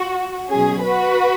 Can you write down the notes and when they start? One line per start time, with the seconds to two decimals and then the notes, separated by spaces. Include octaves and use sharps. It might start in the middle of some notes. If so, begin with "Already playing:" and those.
Already playing: F#4
0.50 B2 F#3 C#4 G#4
0.83 F#4 B4